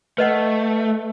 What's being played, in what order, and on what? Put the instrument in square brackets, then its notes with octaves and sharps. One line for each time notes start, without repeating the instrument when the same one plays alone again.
[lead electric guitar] A3 [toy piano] B4 D#5 F#5